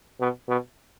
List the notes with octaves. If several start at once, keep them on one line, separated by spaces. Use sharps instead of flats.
B2
B2